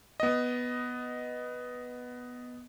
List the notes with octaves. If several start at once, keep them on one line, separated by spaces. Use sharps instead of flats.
B3 D#5